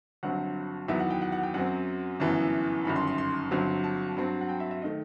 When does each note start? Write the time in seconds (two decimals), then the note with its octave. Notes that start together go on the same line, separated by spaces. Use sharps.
0.23 G1 G2 F#3 C4 F#5
0.88 E2 D#3 F#3 B3 E5
1.00 F#5
1.10 G5
1.21 F#5
1.32 F#5
1.43 G5
1.54 F#2 F#3 C4 F#5
2.20 G1 F#2 E3 B3 A5
2.85 G1 F#2 D#3 B5
2.96 C6
3.07 C6
3.18 C6
3.51 G1 G2 F#3 C4
3.84 A5
4.17 G2 F#3 C4
4.41 F#5
4.49 G5
4.60 E5
4.71 E5
4.82 D#3 A3 D#5